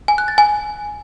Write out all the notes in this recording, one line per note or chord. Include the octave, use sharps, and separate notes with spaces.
G#5
F#6
A6
G#5